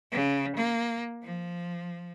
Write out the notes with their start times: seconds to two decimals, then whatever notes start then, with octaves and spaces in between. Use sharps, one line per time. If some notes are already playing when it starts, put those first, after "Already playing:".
0.12 C#3
0.56 A#3
1.22 F3